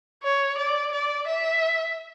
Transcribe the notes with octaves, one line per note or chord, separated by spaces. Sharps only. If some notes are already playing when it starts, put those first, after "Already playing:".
C#5
D5
D5
E5